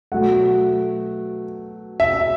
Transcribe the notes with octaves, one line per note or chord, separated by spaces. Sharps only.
B2 F#3 A3 F#5
E5